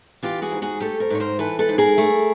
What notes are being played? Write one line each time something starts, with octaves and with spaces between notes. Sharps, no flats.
E3 F4 G4
F#4 G#4
G#2
F#4 G#4
A3 G4 A4
A#4 C5
G#2 C#5
A#4 C5
E3 A4 B4
A4 B4
G#2
G#4 A#4
A3